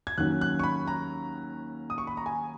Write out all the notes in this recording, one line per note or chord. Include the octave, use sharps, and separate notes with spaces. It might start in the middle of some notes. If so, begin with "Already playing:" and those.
G#6
D#2 D#3 F#3 C#4 F#6
F#6
C#6
B5
A#5
D#6
C#6
B5
A#5
G#5